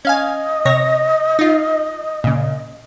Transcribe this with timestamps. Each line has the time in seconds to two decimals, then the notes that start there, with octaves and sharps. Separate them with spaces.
0.05 C#4 D#5 F5 G#5
0.65 C3 C#5 A#6
1.39 D#4 F4
2.24 A#2 C#3